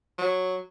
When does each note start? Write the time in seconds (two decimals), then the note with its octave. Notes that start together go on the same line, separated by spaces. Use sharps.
0.18 F#3